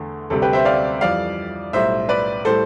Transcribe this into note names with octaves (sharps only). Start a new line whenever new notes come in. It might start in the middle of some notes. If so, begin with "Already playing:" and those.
Already playing: E2 D3 A3
D2 C3 G3 A4
G4 B4
C5 E5
D5 F5
F2 E3 G3 D5 F5
B1 A2 G3 C5 E5
B4 D5
A2 G3 A4 C5